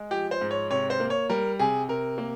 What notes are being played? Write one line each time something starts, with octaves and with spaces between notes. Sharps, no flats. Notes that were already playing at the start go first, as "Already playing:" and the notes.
Already playing: G#3
F3 G4
C5
G#2
C#5
C3 C#5
C5
A#3
C#5
G3 A#4
C3 G#4
C3 A#4
A#3